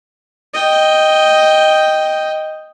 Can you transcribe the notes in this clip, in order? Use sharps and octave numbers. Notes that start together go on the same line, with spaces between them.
D#5 G5